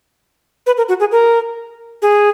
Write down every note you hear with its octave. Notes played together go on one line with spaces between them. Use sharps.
B4
A#4
F#4
G#4
A#4
G#4